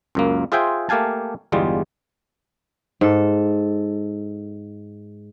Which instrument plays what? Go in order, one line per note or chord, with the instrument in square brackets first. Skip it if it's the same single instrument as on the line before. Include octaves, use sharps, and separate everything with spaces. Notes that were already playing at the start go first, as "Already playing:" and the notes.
[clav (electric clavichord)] C#2 F#2 A#3
F4 G#4 C5 E5 G5 G#5
A3 A#3 G4 F5 G#5 A5
G1 E2 G3 G#3 F4
[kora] G#2 A4